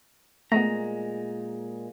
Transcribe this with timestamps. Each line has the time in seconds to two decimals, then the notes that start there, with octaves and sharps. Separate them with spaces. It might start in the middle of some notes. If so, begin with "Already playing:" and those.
0.52 A#2 G#3 A3 B3 A#5